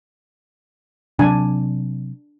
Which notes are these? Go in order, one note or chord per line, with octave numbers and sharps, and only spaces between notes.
C3 F#3 C4 D4 G#5